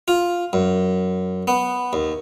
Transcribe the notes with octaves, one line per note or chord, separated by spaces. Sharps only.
F4
F#2
B3
D#2